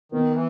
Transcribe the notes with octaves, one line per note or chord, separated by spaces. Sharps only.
D#3 B3
E3